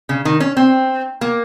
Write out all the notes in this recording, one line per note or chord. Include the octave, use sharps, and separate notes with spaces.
C#3
D#3
C#4
C4
A#3